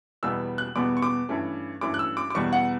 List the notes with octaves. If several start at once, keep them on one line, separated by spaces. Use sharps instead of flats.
E2 B2 G3 B3 E6
F#6
E2 B2 G3 B3 D6
C#6
D6
G2 E3 A3 C#4
G2 E3 A3 C#4 D6
F#6
E6
D6
D6
E2 B2 G3 C#6
F#5